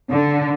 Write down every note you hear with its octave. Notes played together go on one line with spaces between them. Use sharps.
D3